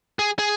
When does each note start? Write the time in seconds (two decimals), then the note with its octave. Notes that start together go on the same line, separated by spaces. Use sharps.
0.19 G#4
0.39 G#4